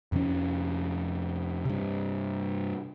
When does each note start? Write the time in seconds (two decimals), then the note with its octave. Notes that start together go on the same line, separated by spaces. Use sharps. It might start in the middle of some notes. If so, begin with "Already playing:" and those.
0.12 F2 C3 F3 C#4
1.65 G2 C3